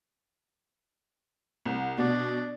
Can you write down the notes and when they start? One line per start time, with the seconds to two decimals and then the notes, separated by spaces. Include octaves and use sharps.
1.65 C2
1.98 B2 D4